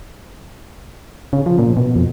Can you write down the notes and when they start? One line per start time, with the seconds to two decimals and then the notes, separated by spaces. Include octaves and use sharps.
1.33 C#3
1.46 F3
1.59 A#2
1.77 B2
1.96 F2